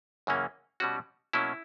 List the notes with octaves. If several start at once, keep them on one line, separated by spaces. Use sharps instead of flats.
F#2 C#3 E3 A#3 C#4
B2 G3 C#4 F#4
B2 F#3 A#3 C#4 E4